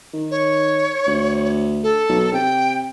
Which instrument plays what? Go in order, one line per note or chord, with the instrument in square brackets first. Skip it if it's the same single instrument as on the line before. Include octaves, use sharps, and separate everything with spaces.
[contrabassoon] D#3
[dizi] C#5
[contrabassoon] D2
[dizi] A4
[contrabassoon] B1
[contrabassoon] C3 [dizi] G5